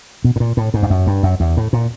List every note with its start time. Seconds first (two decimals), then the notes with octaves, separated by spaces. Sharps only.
0.24 B2
0.36 A2
0.40 A#2
0.57 A2
0.74 G#2
0.83 G2
0.90 F#2
1.07 G2
1.23 F#2
1.40 E2
1.57 A2
1.73 A#2